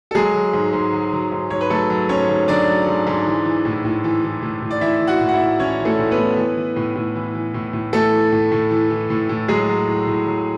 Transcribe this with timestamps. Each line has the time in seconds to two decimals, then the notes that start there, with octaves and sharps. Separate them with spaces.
0.11 A4
0.15 F#3 G#3 G#4
0.34 F#3
0.53 G#2
0.73 G#2
0.93 F#3
1.13 F#3
1.31 G#2
1.50 G#2 C#5
1.61 B4
1.70 F#3 A3 A4
1.90 F#3
2.09 G#2 C#4 C#5
2.29 G#2
2.48 F#3 D4 D5
2.68 F#3
2.87 G#2
3.07 G#2
3.26 E3
3.45 E3
3.65 A2
3.85 A2
4.04 E3
4.23 E3
4.42 A2
4.62 A2
4.71 D5
4.81 E3 E4 E5
5.01 E3
5.07 F#4 F#5
5.21 A2
5.29 F#5
5.34 E4 E5
5.40 A2
5.59 E3 C#4 C#5
5.79 E3
5.85 A3 A4
5.99 A2
6.11 B3 B4
6.18 A2
6.37 E3
6.57 E3
6.76 A2
6.95 A2
7.15 E3
7.34 E3
7.54 A2
7.73 A2
7.93 E3 A3 A4
8.12 E3
8.32 A2
8.51 A2
8.71 E3
8.90 E3
9.10 A2
9.29 A2
9.48 F#3 G#3 G#4
9.68 F#3
9.87 A2
10.07 A2
10.26 F#3